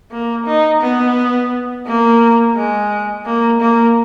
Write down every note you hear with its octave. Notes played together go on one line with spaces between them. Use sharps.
A#3
D#4
B3
A#3
G#3
A#3
A#3